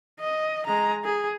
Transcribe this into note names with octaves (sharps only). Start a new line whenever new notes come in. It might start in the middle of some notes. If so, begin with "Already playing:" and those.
D#5
G#3 A#5
G#4